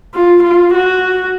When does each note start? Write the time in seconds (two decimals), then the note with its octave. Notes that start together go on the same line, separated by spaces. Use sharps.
0.14 F4
0.43 F4
0.74 F#4